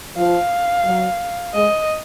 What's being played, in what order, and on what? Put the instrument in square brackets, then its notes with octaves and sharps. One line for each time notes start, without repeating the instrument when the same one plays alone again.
[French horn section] F3 [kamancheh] F5
[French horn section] F#3
[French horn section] G#3 [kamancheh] D#5